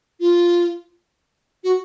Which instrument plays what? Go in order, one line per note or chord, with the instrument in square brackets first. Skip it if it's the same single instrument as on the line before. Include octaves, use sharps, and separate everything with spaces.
[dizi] F4
F#4